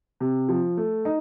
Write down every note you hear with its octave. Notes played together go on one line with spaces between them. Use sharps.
C3
F3
A3
D#4